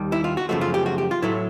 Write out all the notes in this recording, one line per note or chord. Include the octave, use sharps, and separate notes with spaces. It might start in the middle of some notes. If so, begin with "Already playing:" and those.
Already playing: D#2 D#3 G3
E4
F4
F#4
F#2 C#3 F3 A3 F#4
F4
G4
F#4
G4
F4
A2 F#3 A3 E4